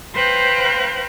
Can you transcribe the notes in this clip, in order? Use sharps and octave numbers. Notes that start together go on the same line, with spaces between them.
B4 C5 F5 G5 A#5 F#6